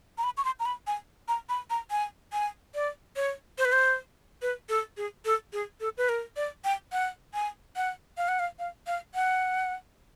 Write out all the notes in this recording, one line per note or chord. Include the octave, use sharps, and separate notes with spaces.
A#5
B5
C#6
C6
A#5
B5
G#5
A#5
B5
A#5
G#5
G#5
D5
C#5
C5
B4
C5
B4
A4
G#4
A4
G#4
A4
B4
A#4
D5
G5
F#5
G#5
F#5
F5
F#5
F5
F5
F5
F#5